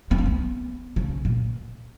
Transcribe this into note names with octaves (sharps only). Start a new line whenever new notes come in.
B3
C#4
B3
C#3
A#2